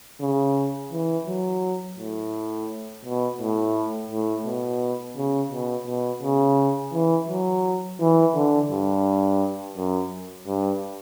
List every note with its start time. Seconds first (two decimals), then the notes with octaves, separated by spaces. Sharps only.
0.21 C#3
0.92 E3
1.27 F#3
1.98 A2
3.05 B2
3.40 A2
4.11 A2
4.46 B2
5.17 C#3
5.51 B2
5.87 B2
6.22 C#3
6.94 E3
7.28 F#3
8.00 E3
8.35 D3
8.71 G2
9.77 F#2
10.47 G2